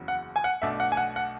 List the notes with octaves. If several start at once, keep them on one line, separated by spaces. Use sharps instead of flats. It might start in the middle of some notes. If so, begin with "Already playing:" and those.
Already playing: F#1 E2 C#3 F#3
F#5
G#5
F#5
B1 B2 A3 D4 E5
F#5
G#5
F#5
F#5